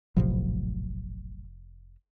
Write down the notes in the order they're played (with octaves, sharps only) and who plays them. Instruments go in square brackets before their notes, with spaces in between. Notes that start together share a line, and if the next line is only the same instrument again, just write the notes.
[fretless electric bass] F1 C3 F3 [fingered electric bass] A#1 A2 F#3